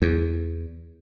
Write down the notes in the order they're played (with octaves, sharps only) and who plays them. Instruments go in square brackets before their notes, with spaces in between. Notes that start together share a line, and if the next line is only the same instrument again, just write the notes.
[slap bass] E2